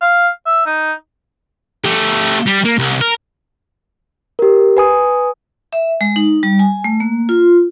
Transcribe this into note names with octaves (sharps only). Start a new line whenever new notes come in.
F5
E5
D#4
A3 G4
G3
A#3
C2
A#4
G4 A#4
B4 G#5 D#6
E5
G#3
D#4
G3
G#5
A3
A#3
F4